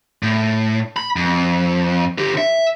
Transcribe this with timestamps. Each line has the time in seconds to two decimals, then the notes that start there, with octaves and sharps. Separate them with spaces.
0.23 A2
0.97 B5
1.16 F2
2.18 D3 G4
2.37 E5